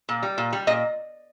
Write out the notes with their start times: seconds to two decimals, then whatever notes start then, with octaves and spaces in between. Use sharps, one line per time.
0.09 A#2
0.23 G3
0.38 A#2
0.53 G3
0.67 A#2 D#5